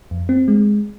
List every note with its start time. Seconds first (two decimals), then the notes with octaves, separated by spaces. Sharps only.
0.11 F2
0.29 C4
0.48 G#3